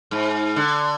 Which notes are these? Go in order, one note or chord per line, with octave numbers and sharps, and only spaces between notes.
G#2
D3